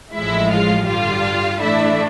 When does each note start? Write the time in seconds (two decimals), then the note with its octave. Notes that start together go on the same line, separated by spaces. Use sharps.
0.15 A1 A2 F3 G#3 E4 E5
0.51 F4 F5
0.88 G2 D3 G3 F4 F5
1.60 A2 E3 A3 D4 E4 E5